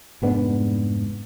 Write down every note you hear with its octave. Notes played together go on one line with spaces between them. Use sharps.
F1 G#2 B3 D4